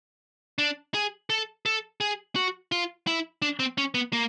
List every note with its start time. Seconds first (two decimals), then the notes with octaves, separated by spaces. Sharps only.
0.58 D4
0.94 G#4
1.30 A4
1.66 A4
2.01 G#4
2.36 F#4
2.72 F4
3.07 E4
3.42 D4
3.60 C4
3.78 C#4
3.94 B3
4.13 A#3